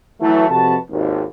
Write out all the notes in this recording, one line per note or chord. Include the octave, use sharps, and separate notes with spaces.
E3 F#3 A3
F2 C3 F#4 B4 A5
G#1 D#2